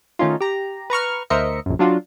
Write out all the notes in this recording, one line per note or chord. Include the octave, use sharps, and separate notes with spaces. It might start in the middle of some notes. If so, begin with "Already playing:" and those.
D#3 A3 C#4 D#4 F4
G4 A#5
B4 A#5 C#6 F6
D2 A#4 C5 D#5 E5 C#7
A#1 F#2
F#3 D4 F4 F#4